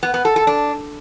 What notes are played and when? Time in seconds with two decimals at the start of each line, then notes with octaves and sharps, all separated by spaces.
0.03 B3
0.14 B3
0.25 A4
0.36 A4
0.47 D4